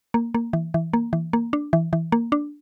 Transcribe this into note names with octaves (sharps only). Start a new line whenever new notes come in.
A#3
A#3
E3
E3
A#3
E3
A#3
D4
E3
E3
A#3
D4